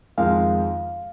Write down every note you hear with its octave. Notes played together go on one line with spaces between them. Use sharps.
F2 D#3 G#3 C4 F5